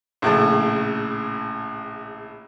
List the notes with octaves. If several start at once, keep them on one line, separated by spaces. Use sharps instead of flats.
A#1 A2 C#3 A5